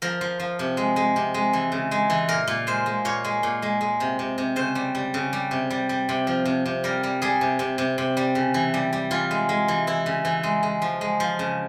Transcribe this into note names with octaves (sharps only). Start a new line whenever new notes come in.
F3 A#4
F3
F3
C3
G#3
G#3
C3
G#3
E3
C#3
G#3
E3
A#2 A#4
A#2
G#3 C5
G#3
A#2 C#5
G#3
A#2
G#3
G#3
C3
C3
C3
C#3 C5
G3
G3
C#3
G3
C3
G3
G3
C3
F3
C3
C3
G3 A#4
G3
G3 G#4
C3
C3
C3
C3
G3
C#3
E3
G3
G3
E3 F4
G#3
G#3
E3
E3 E4
C#3
E3
G#3
G#3
F3
G#3
F3
C#3